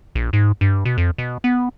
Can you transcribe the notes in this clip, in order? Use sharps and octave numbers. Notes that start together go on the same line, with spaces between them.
A#1
G#2
G2
B2
F2
B2
B3